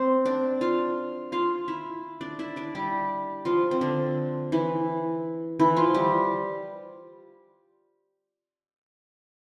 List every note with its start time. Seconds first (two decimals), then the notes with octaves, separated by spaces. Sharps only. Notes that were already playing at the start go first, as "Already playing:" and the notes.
Already playing: C4 C5
0.25 D4 D5
0.61 F4 F5
1.32 F4 F5
1.68 E4 E5
2.21 D4 D5
2.39 E4 E5
2.56 D4 D5
2.75 G3 G4
3.45 F3 F4
3.71 C4
3.81 D3 D4
4.52 E3 E4
5.59 E3 E4
5.77 F3 F4
5.94 G3 G4